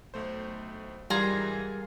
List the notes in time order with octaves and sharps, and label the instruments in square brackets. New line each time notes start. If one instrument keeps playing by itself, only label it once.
[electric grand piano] B1 A3 C5
[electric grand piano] G#2 E3 [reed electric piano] G3 A#4 [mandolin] F4 G#4 A#5